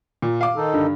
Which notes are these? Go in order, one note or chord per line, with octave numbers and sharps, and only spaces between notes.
A#2
F5 D6
D#3 D#4 A4
G2 D3